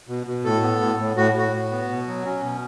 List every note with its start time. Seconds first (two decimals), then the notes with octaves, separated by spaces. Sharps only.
0.09 B2
0.27 B2
0.44 A2 A4
0.62 B3
0.81 A2
0.99 A2
1.16 A2 F#4
1.34 A2 F#4
1.52 A2
1.71 B3
1.89 B2
2.07 F#3
2.25 C#4
2.42 B2